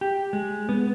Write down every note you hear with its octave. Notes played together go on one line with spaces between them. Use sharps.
G4
G#3
B3